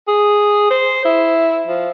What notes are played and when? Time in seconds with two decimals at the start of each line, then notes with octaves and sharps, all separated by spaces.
0.08 G#4
0.71 C5
1.05 E4
1.67 F3